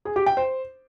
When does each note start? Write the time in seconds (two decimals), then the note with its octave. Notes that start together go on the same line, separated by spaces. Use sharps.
0.05 G#4
0.16 G4
0.26 G5
0.37 C5